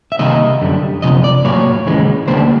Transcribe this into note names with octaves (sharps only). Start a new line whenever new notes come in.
E5
C2 C3 D#3 A#3 D#5
F#2 D3 G3
E2 C3 F3 D#5
D5
A2 F#3 A#3 C#5
D#2 C#3 E3 G#3
D2 D3 G3 A#3 C5